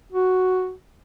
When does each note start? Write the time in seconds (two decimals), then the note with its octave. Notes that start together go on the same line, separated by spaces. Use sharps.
0.13 F#4